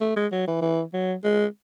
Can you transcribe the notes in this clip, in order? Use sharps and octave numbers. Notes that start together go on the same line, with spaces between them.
A3
G#3
F#3
E3
E3
F#3
G#3